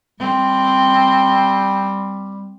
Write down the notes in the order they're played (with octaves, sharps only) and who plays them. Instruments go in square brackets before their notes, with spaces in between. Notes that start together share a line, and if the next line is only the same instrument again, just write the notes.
[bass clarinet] G3 [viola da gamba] C4